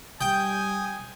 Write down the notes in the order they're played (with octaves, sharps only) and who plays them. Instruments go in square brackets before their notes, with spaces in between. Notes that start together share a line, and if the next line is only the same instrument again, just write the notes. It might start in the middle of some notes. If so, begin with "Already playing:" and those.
[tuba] G3 [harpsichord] G5 [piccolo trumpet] G#5 [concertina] D#6